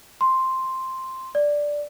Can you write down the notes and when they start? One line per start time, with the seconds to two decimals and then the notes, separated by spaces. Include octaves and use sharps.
0.21 C6
1.35 D5